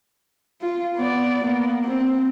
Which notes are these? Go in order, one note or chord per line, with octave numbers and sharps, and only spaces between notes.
F4
B3 D5
A#3 B3
C4